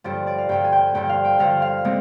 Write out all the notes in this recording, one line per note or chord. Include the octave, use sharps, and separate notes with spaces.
G2 D3 F3 D5
D5
F5
G2 D3 F3 G5
G#5
G5
G2 D3 F3 G5
F5
G5
G2 D3 F3 F5
F5
D3 G#3 C4